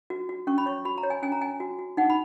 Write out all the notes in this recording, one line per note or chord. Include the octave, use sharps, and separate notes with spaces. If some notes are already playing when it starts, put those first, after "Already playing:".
F#4
F#4
C#4 C#6
B5
C#5 C#6
F#4 B5
A#5
C#5
G#5
C#4 G#5
A#5
C#4 G#5
F#4
F#4
D#4 F#5
B5